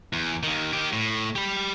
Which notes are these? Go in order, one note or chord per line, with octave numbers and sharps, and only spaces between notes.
E2
D#2 D#3
D#3 G4
A2
G4 B5